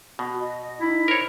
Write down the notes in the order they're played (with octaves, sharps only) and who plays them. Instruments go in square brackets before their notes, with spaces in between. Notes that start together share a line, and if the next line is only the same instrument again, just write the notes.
[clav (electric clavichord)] B2 [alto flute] F#4
[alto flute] D#5
[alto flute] D#4 [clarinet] E4
[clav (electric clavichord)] A#4 C#5 [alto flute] C5